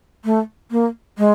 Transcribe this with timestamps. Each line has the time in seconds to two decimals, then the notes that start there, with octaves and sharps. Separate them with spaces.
0.24 A3
0.71 A#3
1.18 G#3